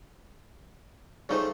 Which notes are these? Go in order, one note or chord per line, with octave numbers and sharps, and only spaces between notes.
C#3 F3 G3 A3 D#4 C5